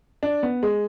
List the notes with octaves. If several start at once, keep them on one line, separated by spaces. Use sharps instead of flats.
D4
B3
G#3